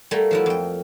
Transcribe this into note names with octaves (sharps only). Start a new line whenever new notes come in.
G3 A3 A#3 G5 G#5 A#5
F3 F#3 E4
F2 G5